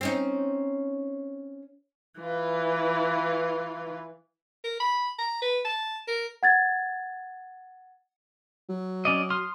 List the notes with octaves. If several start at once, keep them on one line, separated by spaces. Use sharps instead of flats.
C4 C#4 D#4
E3 F4 B4
A#4
B5
A#5
B4
A5
A#4
F#5 G#6 A6
F#3
C#4 D5 D#5
C6 D#6 F6